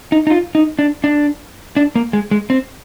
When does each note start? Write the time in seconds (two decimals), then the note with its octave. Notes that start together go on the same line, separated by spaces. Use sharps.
0.12 D#4
0.27 D#4
0.30 F4
0.55 D#4
0.79 D4
1.04 D4
1.77 D4
1.96 A#3
2.13 G#3
2.31 G#3
2.50 C4